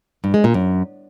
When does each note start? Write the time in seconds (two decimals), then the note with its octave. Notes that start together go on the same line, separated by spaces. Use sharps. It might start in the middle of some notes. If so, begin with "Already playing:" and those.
0.24 G2
0.34 G#3
0.44 A#2
0.54 F#2